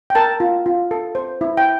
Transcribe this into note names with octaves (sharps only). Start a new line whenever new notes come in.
G5
A#4 A5
F4
F4
A4
C5
E4
G5